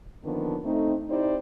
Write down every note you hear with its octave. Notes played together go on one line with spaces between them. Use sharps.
D3 D#3 F3 A#3 B3 D4
A3 C4 D#4
C4 D#4 E4 G4 C5 D5